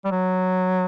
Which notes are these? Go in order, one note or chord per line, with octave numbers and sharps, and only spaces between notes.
G3
F#3